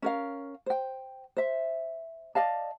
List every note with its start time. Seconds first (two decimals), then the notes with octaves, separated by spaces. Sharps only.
0.02 C#4 A#4 F5
0.66 C5 G5
1.37 C5 E5
2.35 D5 D#5 F5 A5